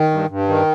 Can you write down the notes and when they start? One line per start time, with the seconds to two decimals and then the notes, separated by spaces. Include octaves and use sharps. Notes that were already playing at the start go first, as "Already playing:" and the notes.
Already playing: D#3
0.11 G2
0.29 G2
0.48 D#3